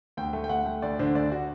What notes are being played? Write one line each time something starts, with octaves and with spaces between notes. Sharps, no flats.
D2 G5
A3
G5
D2 F#5
A3
D2 D5
D3 C5
D2 D5
F#4